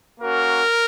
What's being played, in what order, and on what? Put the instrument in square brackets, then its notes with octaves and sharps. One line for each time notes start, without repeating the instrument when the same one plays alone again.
[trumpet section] A#3 C#4 F#4 A#4